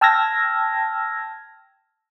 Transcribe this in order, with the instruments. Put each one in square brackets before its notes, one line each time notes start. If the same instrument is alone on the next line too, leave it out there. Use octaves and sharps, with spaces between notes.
[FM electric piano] G5 A5 E6 F6 G#6 A#6